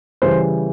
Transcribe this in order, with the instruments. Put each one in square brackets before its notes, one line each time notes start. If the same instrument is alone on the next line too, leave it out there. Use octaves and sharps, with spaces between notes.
[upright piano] C#3 E3 G3 C5